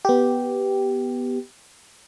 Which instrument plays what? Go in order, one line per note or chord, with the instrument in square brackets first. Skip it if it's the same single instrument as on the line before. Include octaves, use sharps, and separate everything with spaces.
[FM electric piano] B3 G4